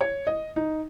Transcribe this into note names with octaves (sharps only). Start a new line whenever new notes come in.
C#5
D#5
D#4